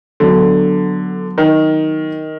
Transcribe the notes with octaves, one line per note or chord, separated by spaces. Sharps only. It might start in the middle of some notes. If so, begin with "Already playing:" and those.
D3 F#3 B3 D4
D#3